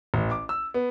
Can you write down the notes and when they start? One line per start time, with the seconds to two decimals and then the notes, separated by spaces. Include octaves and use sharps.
0.14 A1
0.31 D6
0.49 E6
0.74 B3